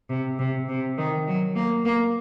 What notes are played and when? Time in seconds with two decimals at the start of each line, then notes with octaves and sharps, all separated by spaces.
0.10 C3
0.39 C3
0.69 C3
0.98 D#3
1.27 F#3
1.56 A#3
1.85 A#3